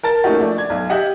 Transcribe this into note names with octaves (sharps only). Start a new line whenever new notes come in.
A#4 A5 A6
A3 A#3 C#4 D#4 F4 F#4
F3 A3 D4
D5 G#6
B1
G4 D#5 E5 F#5